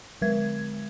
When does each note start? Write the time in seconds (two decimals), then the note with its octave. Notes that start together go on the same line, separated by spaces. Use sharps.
0.22 D3 G#3 G#6